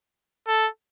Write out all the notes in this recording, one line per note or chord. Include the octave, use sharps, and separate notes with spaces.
A4